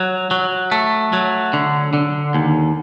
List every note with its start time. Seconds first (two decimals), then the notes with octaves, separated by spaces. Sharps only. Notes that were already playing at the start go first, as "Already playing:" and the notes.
Already playing: F#3
0.31 F#3
0.72 A3
1.13 F#3
1.53 D3
1.93 D3
2.34 D#2